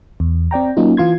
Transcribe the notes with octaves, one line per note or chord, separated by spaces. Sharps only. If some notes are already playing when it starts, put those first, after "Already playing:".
E2
C4 D5 G5 A#5
F#3 A#3 C#4 D#4 F4
E3 F4 C6 G#6